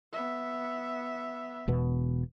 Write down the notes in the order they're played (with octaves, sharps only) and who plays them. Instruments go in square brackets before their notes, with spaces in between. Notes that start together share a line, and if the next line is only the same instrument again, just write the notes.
[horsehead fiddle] B3 E5
[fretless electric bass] E1 B2 B3